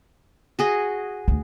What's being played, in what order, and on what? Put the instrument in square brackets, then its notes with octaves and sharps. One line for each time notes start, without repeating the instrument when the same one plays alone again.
[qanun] F#4 G#4 D#5
[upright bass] D2